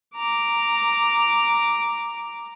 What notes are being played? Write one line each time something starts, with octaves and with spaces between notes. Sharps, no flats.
A#5 D6